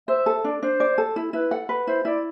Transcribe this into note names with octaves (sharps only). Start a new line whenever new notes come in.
C5 E5
A4
D4 D5
D4 C5
D5
A4
E4
E4 B4
A4 F#5
B4
E4 C5
E4 D5